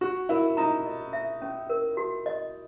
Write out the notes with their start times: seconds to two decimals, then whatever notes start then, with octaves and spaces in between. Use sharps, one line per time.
0.01 F#4 C#6
0.29 E4 A#4
0.57 D#4 A#5
0.86 D#5
1.13 E5
1.42 C#4
1.70 A#4
1.97 F#4
2.26 D#5